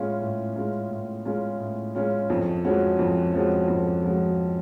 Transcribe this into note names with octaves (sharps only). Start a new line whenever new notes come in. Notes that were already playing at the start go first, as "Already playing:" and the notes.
Already playing: A2 G#3 C#4 F4
A2
G#3 C#4 F4
A2
G#3 C#4 F4
A2
G#3 C#4 F4
F2
F3 G#3 C#4 F#4
F2
F3 G#3 C#4 F#4
F2
F3 G#3 C#4 F#4